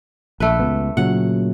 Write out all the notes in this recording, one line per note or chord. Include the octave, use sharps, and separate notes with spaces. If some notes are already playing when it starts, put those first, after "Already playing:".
A#1 A3 B4
C#2 B3
A#2 C#3 F#3 F#5